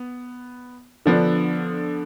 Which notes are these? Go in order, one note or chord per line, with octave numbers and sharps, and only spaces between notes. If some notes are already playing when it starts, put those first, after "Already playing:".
Already playing: B3
D3 F3 B3 D4